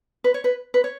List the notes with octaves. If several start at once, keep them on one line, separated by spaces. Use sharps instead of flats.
B4
C#5
B4
B4
C#5